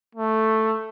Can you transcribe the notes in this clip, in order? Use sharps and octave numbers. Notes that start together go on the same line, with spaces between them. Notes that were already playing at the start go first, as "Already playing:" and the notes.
A3